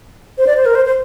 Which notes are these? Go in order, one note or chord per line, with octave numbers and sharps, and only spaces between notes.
C5
D5
C5
A#4
C5
C5